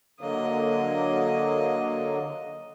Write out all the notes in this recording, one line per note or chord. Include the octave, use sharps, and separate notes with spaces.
D3 F#3 A#3 D#5